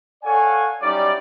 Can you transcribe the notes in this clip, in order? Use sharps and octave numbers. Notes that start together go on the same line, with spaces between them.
A4 C#5 D5 F5 F#5 G#5
F#3 G3 C#4 D#4 E4 D5